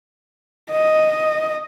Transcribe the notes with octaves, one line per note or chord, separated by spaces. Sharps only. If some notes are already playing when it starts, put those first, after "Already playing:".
D#5